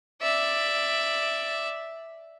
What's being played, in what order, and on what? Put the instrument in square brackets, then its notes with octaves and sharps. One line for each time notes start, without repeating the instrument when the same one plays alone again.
[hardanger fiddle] D5 E5